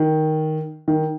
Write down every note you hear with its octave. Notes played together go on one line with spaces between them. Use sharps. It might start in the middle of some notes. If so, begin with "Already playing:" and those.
Already playing: D#3
D#3